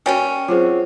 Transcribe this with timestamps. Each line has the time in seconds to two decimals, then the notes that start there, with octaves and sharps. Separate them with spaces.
0.06 G3 A#3 C#4 F#4 C#5 G5 G#5
0.48 F#3 C4 F4 G#4 C#5